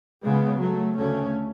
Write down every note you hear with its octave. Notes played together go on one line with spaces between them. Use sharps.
C#2 C#3 G#3 B3
F#3 A3
D2 C#3 A3 C#4